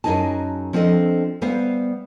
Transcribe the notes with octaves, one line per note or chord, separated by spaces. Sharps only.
F#2 A#2 D#4 G#4 A5
F3 C4 D4 A4 D#5
G3 B3 C5 E5 F5